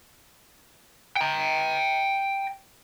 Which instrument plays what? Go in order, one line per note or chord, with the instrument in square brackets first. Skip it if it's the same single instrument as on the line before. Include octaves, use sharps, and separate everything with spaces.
[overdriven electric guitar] G5 A#5